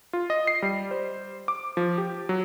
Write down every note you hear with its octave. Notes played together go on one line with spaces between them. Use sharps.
F4
D#5
C7
G3
C5
D6
F3
G4
F#3